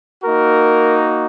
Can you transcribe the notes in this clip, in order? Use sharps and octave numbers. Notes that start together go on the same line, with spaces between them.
A#3 D#4 F#4 A#4